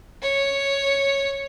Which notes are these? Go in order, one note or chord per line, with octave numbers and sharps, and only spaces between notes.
C#5